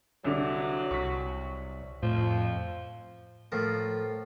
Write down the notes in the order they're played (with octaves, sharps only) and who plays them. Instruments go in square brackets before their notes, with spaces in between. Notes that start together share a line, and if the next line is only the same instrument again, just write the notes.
[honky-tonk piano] C2 D3 D4 [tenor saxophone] F#3
[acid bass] C2 [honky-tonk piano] C#6 B6
[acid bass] F2 [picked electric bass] A2 [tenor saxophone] F3
[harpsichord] A2 F3 A#4